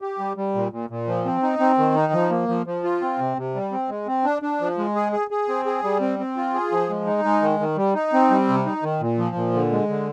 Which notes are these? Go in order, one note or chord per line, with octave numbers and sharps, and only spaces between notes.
G4
G3
G3
A#2
A#2
A#2
F3
C4
D#4
C4
D#3
D#4
F3
A#3
F3
F3
F4
C4
C3
C3
G3
C4
G#3
C4
D4
D4
F3
G#3
G#4
G#4
G#4
C4
G#4
G3
C4
C4
F4
G#4
F3
G#3
D#4
G#3
D#3
D#3
G3
D#4
C4
G3
C3
D#4
D#3
A#2
F3
A#2
D3
G#3
D3